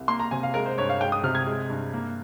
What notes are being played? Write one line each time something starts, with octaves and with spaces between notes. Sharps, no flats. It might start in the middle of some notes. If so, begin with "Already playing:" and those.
Already playing: C2
A#3 C6
A#5
C3 G#5
F5
G#3 A#4
C5
G2 C#5
F5
G#3 G5
D#6
C3 F6
G#6
G#3
G2
A#3